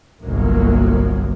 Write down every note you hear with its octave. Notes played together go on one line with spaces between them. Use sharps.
G1 C2 F#3 A#3